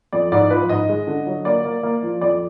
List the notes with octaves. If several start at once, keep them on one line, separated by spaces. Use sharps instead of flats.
F2 D5
G#2 D5
F3 B4
G#2 D#5
G#3
D3
F#3
A#3 D5
A#3
A#3
F3
F2 D5